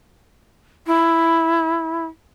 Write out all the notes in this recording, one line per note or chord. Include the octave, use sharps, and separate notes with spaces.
E4